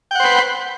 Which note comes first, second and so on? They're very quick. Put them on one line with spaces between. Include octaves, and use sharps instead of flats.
G5 F#5 C5 B4